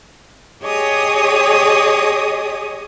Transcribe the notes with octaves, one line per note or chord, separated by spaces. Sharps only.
G4 G#4 C#5 D#5 D#6